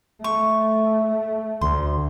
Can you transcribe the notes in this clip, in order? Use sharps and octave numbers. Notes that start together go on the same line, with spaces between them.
A3 C#6
D2 C6